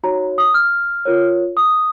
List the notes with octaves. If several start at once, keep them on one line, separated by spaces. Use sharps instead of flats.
D#4 F#4 C#5 A#5
D#6
F6
F4 A#4 C#5
D#6